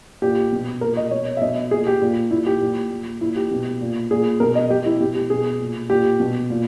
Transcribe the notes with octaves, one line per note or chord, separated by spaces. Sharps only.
A#2 G4
B2
A#2 A#4
D#5
B2 C#5
E5
B2 D#5
A#2 G#4
G4
A#2
A#2 E4
G4
A#2
A#2
A#2 E4
G4
B2
A#2
A#2 G#4
B2 A#4
D#5
B2 G4
E4
B2 G4
G4
B2 G#4
A#2
A#2 G4
B2
A#2